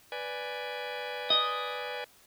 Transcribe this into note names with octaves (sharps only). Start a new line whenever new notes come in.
B4 D5 G#5
D#5